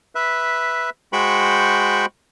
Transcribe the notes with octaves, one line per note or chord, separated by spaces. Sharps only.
B4 E5
G#3 F#4 C5 G5 B5 C#6